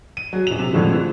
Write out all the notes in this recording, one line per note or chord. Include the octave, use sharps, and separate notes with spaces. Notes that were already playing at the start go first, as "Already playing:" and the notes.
D#7
F#3 G#4
D#1 F7
C3
F2 A2 D3 F3 G#3
E3